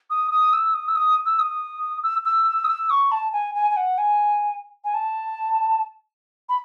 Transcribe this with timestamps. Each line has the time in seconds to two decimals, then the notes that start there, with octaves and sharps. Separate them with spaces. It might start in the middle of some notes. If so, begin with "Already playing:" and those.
0.10 D#6
0.31 D#6
0.53 E6
0.74 D#6
0.88 E6
0.96 D#6
1.26 E6
1.39 D#6
2.03 E6
2.25 E6
2.64 D#6
2.68 E6
2.90 C#6
3.11 A5
3.33 G#5
3.55 G#5
3.70 G#5
3.77 F#5
3.98 G#5
4.84 G#5
4.94 A5
6.49 B5